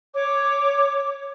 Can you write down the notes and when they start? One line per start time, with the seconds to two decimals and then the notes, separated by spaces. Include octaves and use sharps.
0.14 C#5 D6